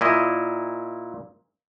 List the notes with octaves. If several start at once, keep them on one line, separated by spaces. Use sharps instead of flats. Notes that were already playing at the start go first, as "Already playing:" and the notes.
A#2 E4 D#5